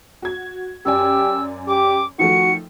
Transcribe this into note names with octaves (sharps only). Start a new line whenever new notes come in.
F#4 G#6
F#2 G4 D5 G#5 E6
G4 D6
D#3 F3 A3 F#4 C#7